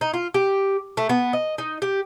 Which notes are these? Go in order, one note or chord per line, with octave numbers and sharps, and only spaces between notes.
D#4
F4
G4
A3
B3
D#5
D#4
G4